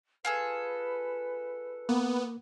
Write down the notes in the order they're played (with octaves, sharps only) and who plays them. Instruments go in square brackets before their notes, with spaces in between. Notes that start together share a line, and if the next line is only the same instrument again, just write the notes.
[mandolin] F4 G#4 A4 [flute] B4
[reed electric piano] A#3 [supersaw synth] B3